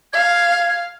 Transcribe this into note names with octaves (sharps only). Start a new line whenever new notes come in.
F5 G#6